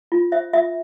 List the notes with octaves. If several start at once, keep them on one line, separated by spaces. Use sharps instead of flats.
F4
C5 E5
F4 E5